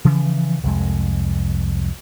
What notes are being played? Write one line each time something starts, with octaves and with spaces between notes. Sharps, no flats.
C#3 E3 F3
C2 F2 G#3